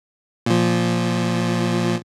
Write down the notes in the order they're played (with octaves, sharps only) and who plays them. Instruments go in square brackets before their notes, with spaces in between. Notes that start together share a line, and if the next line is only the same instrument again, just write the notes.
[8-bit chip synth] A#2 F3